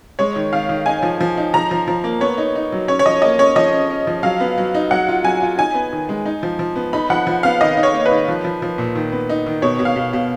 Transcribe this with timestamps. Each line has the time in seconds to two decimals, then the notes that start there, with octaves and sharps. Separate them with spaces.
0.19 G#3 C#5
0.36 D#3
0.53 D#3 F5
0.69 D#3
0.86 D#4 G#5
1.03 F3
1.20 F3
1.37 D#4
1.54 F3 A#5
1.71 F3
1.87 F3
2.04 A#3
2.20 B3 C#5
2.38 D#4
2.55 D#4
2.72 F#3
2.88 C#4 C#5
2.99 C#5
3.06 F3 D#5
3.22 A#3 D#5
3.39 C#4 C#5
3.56 F3 D#5
3.73 C#4
3.90 C#4
4.07 F3
4.23 F#3 F5
4.40 B3
4.58 F#3
4.74 D#4
4.91 F#3 F#5
5.08 F4
5.24 F#3 G#5
5.42 F4
5.58 D#4 G#5
5.74 B3
5.92 D#3
6.09 G#3
6.26 D#4
6.43 F3
6.59 F3
6.76 B3
6.93 D#4 B5
7.10 F3 F#5
7.27 F3
7.43 B3 F5
7.61 D#3 D#5
7.77 D#4
7.83 C#5
7.94 A#3
8.06 B4
8.11 D#3
8.28 F3
8.44 F3
8.62 F3
8.78 A#2
8.95 D#3
9.12 B3
9.29 D#4
9.46 D#3
9.62 B2 C#5
9.79 B2
9.85 F5
9.96 B2
10.13 B2